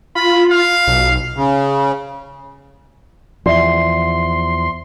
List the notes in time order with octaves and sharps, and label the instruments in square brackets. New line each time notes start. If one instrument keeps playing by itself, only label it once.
[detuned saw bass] F4 [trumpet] B5
[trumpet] F5
[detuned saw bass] B1
[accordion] C#3
[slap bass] E2 F3 [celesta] D5 E5 [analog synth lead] C6